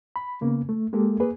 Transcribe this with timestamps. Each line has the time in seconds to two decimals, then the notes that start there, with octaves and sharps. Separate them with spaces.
0.16 B5
0.41 C#3 A#3 B3
0.69 A3
0.93 G#3 A#3 G4 A4
1.20 A#3 G#4 B4